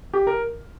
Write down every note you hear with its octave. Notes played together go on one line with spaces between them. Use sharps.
G4
A#4